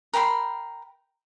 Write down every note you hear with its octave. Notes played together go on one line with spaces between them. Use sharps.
A#4 G5 B5 C6